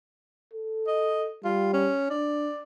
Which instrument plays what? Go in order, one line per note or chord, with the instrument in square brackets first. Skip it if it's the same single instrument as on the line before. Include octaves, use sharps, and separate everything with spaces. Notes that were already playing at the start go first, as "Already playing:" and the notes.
[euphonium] A4
[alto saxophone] D#5
[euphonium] G3 [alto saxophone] F4
[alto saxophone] C#4
[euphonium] D4 [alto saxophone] D5